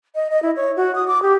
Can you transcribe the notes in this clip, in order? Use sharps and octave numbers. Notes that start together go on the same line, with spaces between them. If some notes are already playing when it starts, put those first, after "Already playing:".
D#5
D#5
E4
C#5
F#4
D#6
D6
G4